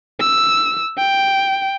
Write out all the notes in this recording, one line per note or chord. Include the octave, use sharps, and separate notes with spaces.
E6
G5